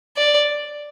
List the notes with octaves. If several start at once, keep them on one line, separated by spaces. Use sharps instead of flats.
D5